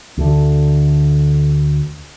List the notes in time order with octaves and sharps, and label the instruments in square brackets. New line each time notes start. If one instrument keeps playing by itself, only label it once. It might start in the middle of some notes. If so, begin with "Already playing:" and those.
[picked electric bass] D2 D3